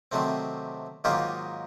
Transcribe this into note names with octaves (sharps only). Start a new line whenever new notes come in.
C3 D#3 F#3 A3 C4
G#2 D#3 F#3 A#3 D#4 F4 G4